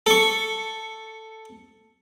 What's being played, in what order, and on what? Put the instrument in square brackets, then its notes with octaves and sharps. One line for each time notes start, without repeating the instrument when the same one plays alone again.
[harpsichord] A4 C#6